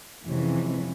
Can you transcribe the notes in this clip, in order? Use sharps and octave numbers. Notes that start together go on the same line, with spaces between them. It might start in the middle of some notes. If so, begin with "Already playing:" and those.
F2 C3 E3 G#3 C#4